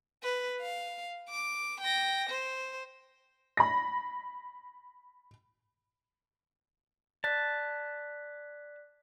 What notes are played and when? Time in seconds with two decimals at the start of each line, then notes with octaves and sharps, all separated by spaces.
0.23 B4
0.61 F5
1.29 D6
1.81 G5 A#6
2.29 C5
3.57 B5 A#6
7.24 D5 A5 F#6 B6